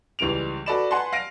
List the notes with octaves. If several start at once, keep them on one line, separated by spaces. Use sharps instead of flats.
C#2 E3 G3 D7 F7
F#4 A4 B4 D5 B5 E7
B4 F#5 G#5 A5 B5 C6
F5 A#6 D7 D#7